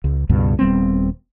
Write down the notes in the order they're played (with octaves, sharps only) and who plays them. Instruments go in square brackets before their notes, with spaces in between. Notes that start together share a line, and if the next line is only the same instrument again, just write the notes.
[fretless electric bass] C#2
C#2 G2 B2
D#1 G3 B3 C4